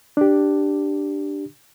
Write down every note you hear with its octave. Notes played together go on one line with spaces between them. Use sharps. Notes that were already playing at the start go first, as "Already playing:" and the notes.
D4 G4